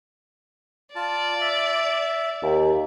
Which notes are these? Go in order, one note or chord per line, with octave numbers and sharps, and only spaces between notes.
F4 D5 A5
E5
D#2